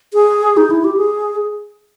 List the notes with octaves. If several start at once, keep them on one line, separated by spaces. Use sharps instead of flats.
G#4
D#4
E4
G4
G#4